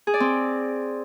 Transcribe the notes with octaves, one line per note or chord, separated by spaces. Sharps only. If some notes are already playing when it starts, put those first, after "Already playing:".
G#4
D5
C4